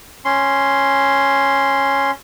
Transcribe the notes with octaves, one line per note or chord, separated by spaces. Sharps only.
C#4 C6